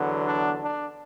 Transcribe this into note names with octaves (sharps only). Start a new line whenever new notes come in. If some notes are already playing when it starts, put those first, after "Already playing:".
Already playing: E2 D3 F#3 B3
D4
D4